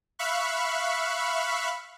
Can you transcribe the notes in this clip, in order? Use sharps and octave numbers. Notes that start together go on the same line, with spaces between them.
E5 F5 B5 C#6 F#6